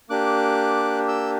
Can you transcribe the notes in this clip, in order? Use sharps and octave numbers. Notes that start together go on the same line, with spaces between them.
A#3 D4 G4 D6 F#6
E6 G6